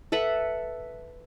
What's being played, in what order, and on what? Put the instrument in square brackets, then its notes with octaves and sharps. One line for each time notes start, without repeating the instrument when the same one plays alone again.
[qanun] A4 B4 E5 F#5